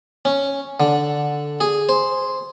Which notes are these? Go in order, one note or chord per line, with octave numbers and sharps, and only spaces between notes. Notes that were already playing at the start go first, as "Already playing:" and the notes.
C#4
D3
G#4
C5